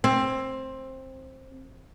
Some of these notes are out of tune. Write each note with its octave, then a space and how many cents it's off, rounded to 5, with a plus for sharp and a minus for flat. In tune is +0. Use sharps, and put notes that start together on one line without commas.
C4 +15